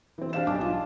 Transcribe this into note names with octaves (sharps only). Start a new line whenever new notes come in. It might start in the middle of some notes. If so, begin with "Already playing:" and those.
E3 C4
D4 G4 F5 E7
B1 A5 D6
F4